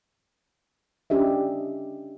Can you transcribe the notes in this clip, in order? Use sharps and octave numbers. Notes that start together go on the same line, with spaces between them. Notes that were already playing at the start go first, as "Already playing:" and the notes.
C#4 D4 G4 D#5 E5